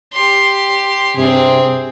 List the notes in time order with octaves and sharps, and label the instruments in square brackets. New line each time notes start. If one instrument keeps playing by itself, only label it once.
[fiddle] G4 C6
[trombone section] G2 C3 [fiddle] C4 G#4